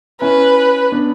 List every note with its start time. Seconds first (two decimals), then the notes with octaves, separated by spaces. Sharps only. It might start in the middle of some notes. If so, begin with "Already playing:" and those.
0.21 C#4 E4 B4
0.92 B3 D4